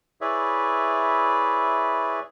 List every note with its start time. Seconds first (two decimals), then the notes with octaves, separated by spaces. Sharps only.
0.21 E4 G#4 B4 C#5 D5 E5